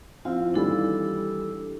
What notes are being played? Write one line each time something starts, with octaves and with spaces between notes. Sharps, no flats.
F3 C4 E4 F4 F5
D#3 E3 G3 D4 A4 E6